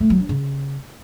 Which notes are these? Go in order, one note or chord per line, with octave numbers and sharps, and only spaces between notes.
A3
F#3
D4
C#3